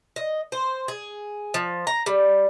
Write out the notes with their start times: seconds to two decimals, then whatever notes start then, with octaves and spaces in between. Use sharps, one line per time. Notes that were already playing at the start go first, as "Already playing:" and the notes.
0.16 D#5
0.52 C5
0.88 G#4
1.54 F3
1.87 A#5
2.06 G3